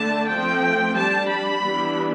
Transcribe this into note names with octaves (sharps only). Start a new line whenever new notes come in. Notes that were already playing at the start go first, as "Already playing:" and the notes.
Already playing: D3 A3 D4 A5
F3 A3 C4 G5
G3 D4 A5
B5
E3 G3 B3 D4